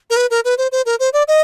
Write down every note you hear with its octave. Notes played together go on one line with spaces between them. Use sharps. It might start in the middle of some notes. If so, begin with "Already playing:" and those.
A#4
B4
A#4
B4
C5
C5
A#4
C5
D5
D#5